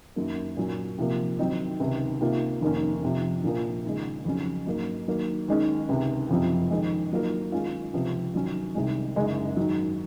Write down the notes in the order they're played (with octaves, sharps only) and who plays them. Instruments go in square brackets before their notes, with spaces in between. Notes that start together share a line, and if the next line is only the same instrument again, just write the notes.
[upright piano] F#2 D#3 F#3 A#3
A#2 F#3 C#4
C3 F3 A#3
D#3 F#3 C4 D#4
C#2 C3 D#3
C3 D#3 A#3 F4
F1 D#2 D#3 A#3 C#4
F2 C3 F3
A#1 A#2 F3 A#3
D#2 C#3 G#3
F2 C#3 F#3 C#4
G#2 F#3 A#3
D#3 F#3 A#3
D#2 D#3 G#3 C#4
C#2 C3 D#3
F#1 F2 C3 F3 C4
F2 D#3 G#3
D#3 F#3 A#3 F4 A#4
D#3 G#3 C#4 F4
C#2 C3 F3 C4
D#3 F#3 C#4
C2 C3 D#3 G#3
F#1 F#2 C#3 G#3
G#2 D#3 F#3